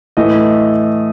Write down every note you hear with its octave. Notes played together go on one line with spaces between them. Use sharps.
A2 E3 A3 D#5